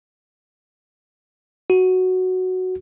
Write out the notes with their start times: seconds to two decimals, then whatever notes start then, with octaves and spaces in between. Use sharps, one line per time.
1.70 F#4